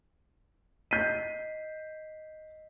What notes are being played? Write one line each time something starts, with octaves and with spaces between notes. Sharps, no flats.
D#5 G6 B6 C7 D#7